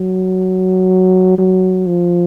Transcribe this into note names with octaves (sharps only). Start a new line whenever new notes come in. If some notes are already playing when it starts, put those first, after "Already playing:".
Already playing: F#3
F#3
F3